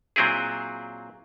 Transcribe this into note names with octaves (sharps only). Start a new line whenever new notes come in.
A#2 F#3 C4 E4 G#4